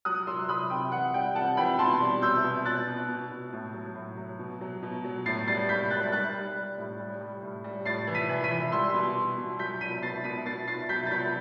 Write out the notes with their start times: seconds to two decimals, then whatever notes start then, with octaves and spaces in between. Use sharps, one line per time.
0.05 F#3 D#6 F#6
0.27 F#3 C6 E6
0.49 F#3 B5 D#6
0.70 C3 G5
0.92 E3 F#5
1.14 G3 G5
1.35 C3 F#5 A5
1.57 E3 G5 B5
1.79 B2 A5 C6
2.01 G3
2.22 B2 E6 G6
2.44 B2
2.65 B2 F#6 A6
2.87 B2
3.09 B2
3.31 B2
3.53 A2
3.74 F#3
3.96 A2
4.17 F#3
4.39 B2
4.61 F#3
4.83 B2
5.05 F#3
5.26 A2 A6 C7
5.47 G3 A6 C7
5.69 A2 G6 B6
5.90 G3 F#6 A6
6.12 G3 F#6 A6
6.34 G3
6.56 G3
6.78 A2
6.99 G3
7.21 G3
7.43 A2
7.64 G3
7.85 A2 A6 C7
8.07 E3
8.15 B6 D#7
8.29 E3
8.44 B6 D#7
8.51 E3
8.72 G3 C6 E6
8.94 B2
9.16 B2
9.38 B2
9.59 F#3 G6 B6
9.81 B2 B6 D#7
10.03 B2 A6 C7
10.24 B2 B6 D#7
10.46 B2 A6 C7
10.67 B2 A6 C7
10.89 F#3 G6 B6
11.06 A6
11.11 F#3 G6 B6